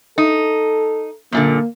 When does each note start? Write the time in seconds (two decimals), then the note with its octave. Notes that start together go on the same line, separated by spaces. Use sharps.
0.18 D#4 A4
1.32 F#2 A#2 D3 A#3